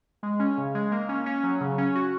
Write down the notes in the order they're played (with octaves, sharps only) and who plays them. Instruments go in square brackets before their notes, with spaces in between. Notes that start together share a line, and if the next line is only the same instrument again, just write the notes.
[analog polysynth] G#3
C#4
C#3
G#3
A#3
C#4
C#4
F#3
C#3
C#4
F#4